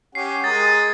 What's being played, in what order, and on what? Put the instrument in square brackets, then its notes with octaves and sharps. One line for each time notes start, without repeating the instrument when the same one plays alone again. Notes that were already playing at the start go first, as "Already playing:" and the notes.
[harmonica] C#4 G4 F#5 [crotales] C7
[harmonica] G#3 A#4 D#6 [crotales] A6